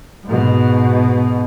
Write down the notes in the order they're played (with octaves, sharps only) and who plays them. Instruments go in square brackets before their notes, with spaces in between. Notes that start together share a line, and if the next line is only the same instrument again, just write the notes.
[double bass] G#2 B2